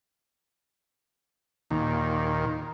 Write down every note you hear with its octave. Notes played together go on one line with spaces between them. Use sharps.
D#2 A#2 D#3